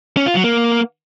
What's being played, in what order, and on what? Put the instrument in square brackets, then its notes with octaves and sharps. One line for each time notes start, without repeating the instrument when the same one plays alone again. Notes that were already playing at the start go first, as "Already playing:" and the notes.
[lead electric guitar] C#4
F4
F#3
A#3